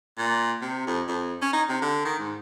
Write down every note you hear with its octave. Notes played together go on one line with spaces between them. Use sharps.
A#2
C3
F2
F2
C#4
D#4
C3
D3
D#3
G#2